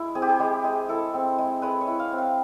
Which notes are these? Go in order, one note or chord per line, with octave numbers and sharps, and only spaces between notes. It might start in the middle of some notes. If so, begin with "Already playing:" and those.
Already playing: G#3 E4
C4 G#4
G4
G#4
G#3 G4
G#3 G#4
E4 A4
C4
G#3
G#3 B4
C#5
E4
F5
C4
F5